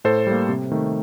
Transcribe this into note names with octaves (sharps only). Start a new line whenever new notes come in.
A2 A4 C5
G3 A#3
C3
D#3 A3